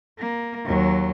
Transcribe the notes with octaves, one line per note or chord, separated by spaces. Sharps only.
A#3
D#2 F#3